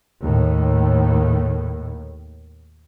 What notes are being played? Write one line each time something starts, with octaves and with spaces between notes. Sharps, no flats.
D#2 A2